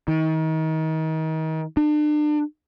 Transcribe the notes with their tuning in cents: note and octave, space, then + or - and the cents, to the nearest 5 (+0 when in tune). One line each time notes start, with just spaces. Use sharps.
D#3 +35
D4 +35